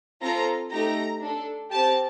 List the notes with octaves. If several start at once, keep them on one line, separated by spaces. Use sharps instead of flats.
C4 F4 A4 A#5
A3 D#4 G4 A#5
D4 A4
C4 G4 A5